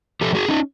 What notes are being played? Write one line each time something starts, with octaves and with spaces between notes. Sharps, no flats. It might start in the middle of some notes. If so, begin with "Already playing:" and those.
A2 F3 G4 A4
F#4 G#4
C#4 D#4